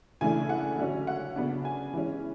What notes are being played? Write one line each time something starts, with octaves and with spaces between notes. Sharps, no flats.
C#3 E3 A3 D4 G#5
F#5
D3 F#3 C#4
F#5
C#3 F#3 B3 D4
G#5
E3 G#3 C#4